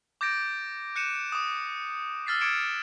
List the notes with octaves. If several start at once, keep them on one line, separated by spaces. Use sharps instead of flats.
D6 G6 A6 A#6 D7
F#6 G6 C#7 D#7 E7
D6 D#6
E6 F6 A6 B6 C7
D6 D#6 G#6 C#7 D7 E7